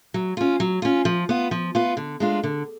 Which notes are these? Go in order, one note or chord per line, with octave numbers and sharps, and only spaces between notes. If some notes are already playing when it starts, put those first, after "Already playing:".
F#3
C#4 F4
F#3
C#4 F4
F3
B3 F4
F3
B3 F4
D3
G#3 D4 F4
D3